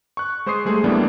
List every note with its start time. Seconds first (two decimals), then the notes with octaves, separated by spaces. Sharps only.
0.17 C#6 F#6
0.46 G#3 C5 C#6 D#6 C7
0.65 G3 A3 G#4 C5
0.84 A2 E3 G3 A#3 B3 D4